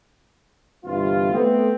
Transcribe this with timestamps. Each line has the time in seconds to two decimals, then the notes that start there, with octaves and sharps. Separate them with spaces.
0.85 G1 G2 C3 E3 F4
1.32 A3 B3 C4